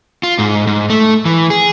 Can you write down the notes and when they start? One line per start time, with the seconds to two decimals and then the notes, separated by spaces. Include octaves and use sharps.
0.23 F4
0.39 G#2
0.67 G#2
0.90 A3
1.25 E3
1.50 G#4